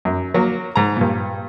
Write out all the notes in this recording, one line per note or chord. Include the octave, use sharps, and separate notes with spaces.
F#2
F#3 A#3
G#2 A#5
G2 A#2